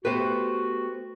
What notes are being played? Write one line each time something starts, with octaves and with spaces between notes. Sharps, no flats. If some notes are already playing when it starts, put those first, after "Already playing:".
A3 B3 F#4 G4 B4 C5